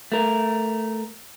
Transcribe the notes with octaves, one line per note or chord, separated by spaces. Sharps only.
A3 A#4